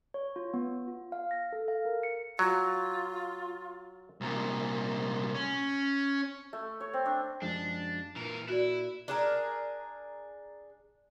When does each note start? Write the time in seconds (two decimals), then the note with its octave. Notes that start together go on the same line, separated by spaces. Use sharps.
0.14 C#5
0.36 F4
0.54 B3
0.88 F4
1.12 F5
1.31 A#6
1.53 A4
1.68 F5
1.85 A#4
2.03 C#7
2.39 F#3 F4
4.21 C2 A#2
5.34 C#4
6.53 A3
6.80 C#5
6.93 C4
7.06 D4
7.42 F#2 F3 G#3 D4
8.16 A#2 E3 A#4
8.49 E4 F#4 D5
9.08 D4 G#4 A#4